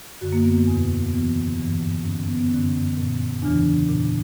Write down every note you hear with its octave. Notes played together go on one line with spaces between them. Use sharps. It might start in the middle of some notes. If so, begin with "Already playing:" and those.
F#2 D3 F#4
A#3
B3
A#3
E2 B2
E2 C#3 E3 B3
G2 E3
G2 D3 C#4
B3
B3
F#2 D3 C#4
A#2
E2 C#3 E3 D4
A#2